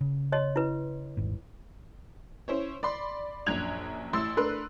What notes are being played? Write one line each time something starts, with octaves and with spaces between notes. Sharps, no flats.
C#3
C#5 D#5 C6
E4 B4
D#1 G#1 G#2
C#4 E4 C5 C#5
D5 B5 C6
A#1 F#2 D4 F#6 G#6 F7
A1 E4 C6 E6 A6
A3 D4 A#4 B4 C6 F#6